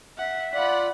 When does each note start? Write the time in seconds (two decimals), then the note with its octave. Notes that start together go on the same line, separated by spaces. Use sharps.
0.18 E5 F#5
0.54 F4 D5 F#5 B5